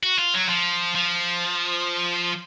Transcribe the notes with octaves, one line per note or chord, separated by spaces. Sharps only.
F#4
F4
F#3
F3
F3